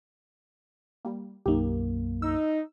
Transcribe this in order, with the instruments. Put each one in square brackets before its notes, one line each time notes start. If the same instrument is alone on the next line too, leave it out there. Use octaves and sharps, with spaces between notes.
[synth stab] G3 A#3
[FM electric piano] B1 F#2 A#3 [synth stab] D#4 G4
[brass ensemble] D#4 [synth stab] E6